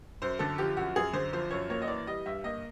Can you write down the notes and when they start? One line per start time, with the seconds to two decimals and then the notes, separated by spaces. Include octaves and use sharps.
0.22 F#2 C5
0.39 D3 A4
0.58 F3 G4
0.77 F#2 F#4
0.95 F#2 G#4
1.13 D3 C5
1.33 F3 C5
1.50 F#2 C#5
1.70 A#3 C#5
1.82 D#5
1.88 E3 D5
2.07 G3 D#5
2.26 G2 E5
2.44 A#3 D#5